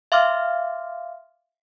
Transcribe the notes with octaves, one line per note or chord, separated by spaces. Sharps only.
E5 F5 C6 D6 F6